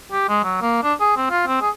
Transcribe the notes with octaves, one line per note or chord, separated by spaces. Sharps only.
G4
G#3
F#3
A#3
D4
G#4
C4
F4
C4
G#4